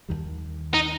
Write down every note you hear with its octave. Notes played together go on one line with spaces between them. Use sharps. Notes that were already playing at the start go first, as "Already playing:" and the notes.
D#2 D#3 G3
D#4